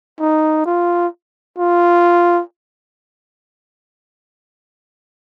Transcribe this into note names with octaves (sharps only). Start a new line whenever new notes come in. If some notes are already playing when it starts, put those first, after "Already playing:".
D#4
F4
F4